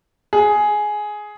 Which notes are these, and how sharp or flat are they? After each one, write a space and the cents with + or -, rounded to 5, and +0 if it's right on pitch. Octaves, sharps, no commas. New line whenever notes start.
G#4 +10